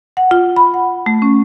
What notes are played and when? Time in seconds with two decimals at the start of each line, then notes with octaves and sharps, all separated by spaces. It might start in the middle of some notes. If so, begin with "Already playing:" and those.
0.17 F#5
0.31 F4
0.56 B5
0.74 F#5
1.06 A3
1.22 C#4